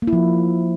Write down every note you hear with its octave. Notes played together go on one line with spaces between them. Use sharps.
A#3
E4
F3